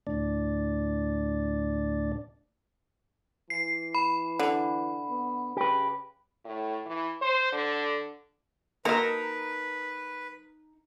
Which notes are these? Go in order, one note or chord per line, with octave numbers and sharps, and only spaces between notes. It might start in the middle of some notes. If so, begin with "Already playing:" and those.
D2 A2 D4 D5
E3 C7
B5
D3
B3
C#3 G4 B4
A2
E3
C5
D3
F#3 A#3 D#4 A#4 B4 A5 A#5